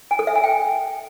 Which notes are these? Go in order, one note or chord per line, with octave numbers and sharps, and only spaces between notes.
G#5
A4
E5
G#5
G5